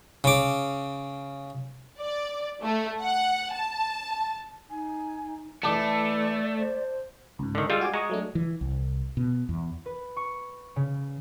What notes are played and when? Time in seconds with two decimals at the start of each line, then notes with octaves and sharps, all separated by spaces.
0.24 C#3 D6
2.00 D5
2.62 A3
3.01 F#5
3.54 A5
4.70 D#4 G#5
5.63 E3 A3 D5 A5 D6
6.58 C5
7.39 C#2 G#2
7.55 D3 D#3
7.70 G3 G#3 F4 E6 F6
7.81 F#4 G#5 D6
7.94 G#3 A#5 C#6 D#6
8.09 F#3 A3 D4
8.35 E3
8.61 C2
9.17 B2
9.49 E2
9.86 B4
10.17 C#6
10.76 C#3